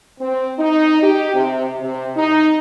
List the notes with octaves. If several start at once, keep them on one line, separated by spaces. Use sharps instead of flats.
C4
D#4
G4
C3
C3
D#4